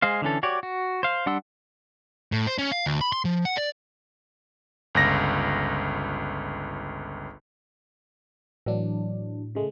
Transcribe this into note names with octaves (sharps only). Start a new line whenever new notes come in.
G#3 G#4 C5 F5
D3 E3 C#4 A4
F#4 G4 C#5 D5
F#4
C5 F5
G3 D4 F#5 C6 E6
A2
C5
C#4
F5
D2
B5
C6
F3
F#5
D5
G1 C#2 A#6
A2 E3 F#3 D4
C#3 G#3 A3